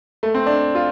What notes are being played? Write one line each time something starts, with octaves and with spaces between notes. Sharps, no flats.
A3
C4
D4
F4